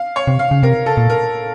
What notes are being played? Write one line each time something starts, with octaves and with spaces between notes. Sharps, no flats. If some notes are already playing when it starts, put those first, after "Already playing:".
Already playing: F5
C#5
C3
F5
C#3
C3 A#4
A4
A#2
A#4